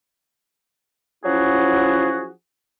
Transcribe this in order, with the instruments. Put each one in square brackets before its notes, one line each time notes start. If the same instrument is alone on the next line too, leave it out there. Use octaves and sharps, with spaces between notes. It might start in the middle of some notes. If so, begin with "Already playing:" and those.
[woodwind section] F3 F#3 C#4 E4 F#4 G#4